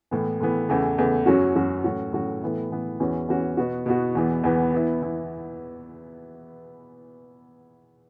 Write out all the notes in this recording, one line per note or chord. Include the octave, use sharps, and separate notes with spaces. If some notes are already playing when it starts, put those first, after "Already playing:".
A2 E3 B3
A2 E3 B3
E2 C#3 E3 A3
E2 C#3 E3 A3
F#2 F#3 C#4 F#4
F#2 F#3 C#4 F#4
A2 F#3 C#4 F#4
A2 F#3 C#4 F#4
A2 E3 B3 E4
A2 E3 B3 E4
E2 E3 C#4 F#4
E2 E3 C#4 F#4
B2 B3 F#4
B2 B3 F#4
E2 E3 B3
E2 E3 B3
E3 B3 E4
E3 B3 E4